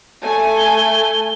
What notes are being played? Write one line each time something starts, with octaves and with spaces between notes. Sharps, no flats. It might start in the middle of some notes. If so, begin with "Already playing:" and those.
A3 G#5
G7